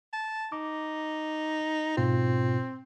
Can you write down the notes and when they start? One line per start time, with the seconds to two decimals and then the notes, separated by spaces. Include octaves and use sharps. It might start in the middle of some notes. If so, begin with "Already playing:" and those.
0.13 A5
0.52 D#4 D6
1.97 G#2 B2 C4 F4